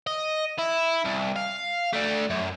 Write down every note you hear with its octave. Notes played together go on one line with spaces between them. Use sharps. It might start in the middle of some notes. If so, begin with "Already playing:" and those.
D#5
E4
C2
F5
A3 D4
F#2